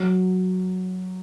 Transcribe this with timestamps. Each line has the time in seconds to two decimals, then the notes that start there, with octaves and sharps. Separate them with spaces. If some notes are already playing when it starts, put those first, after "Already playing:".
Already playing: F#3